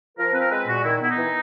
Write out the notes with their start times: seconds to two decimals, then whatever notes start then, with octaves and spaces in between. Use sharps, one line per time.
0.17 F3 A#4
0.33 C4 B4
0.40 A#4
0.51 G#3 B4
0.68 A#2 F#4
0.84 D#3 E4
1.01 B3 E4
1.09 D#4
1.18 E3